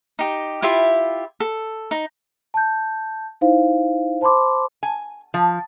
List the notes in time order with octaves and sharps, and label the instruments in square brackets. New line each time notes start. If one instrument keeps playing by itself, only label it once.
[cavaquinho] D#4 G4
E4 F4 G4 E5
A4
D#4
[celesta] A5 G6
D#4 E4 C5 F5
C5 A5 B5 C6 D6
[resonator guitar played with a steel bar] G#5
F3